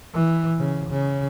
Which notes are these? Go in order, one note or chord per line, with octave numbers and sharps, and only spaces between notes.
E3
C#3
C#3